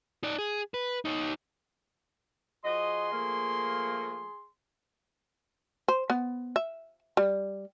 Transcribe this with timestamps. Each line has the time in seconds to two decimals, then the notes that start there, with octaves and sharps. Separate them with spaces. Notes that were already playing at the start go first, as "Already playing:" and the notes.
0.23 D#4 D5
0.38 G#4
0.74 B4
1.05 D#4 C#5
2.64 F3 F#4 G#4 D#5 C6
3.12 F3 A3 A#3
5.88 C5
6.10 B3
6.56 E5
7.17 G3